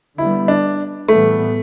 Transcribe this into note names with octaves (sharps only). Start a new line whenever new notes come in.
D3 G3 B3 E4
D4
A2 E3 G3 A3 B3